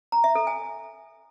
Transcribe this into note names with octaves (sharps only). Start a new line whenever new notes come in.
A#5
E5
A4
G#5